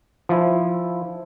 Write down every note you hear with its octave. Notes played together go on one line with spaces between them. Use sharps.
F3 E4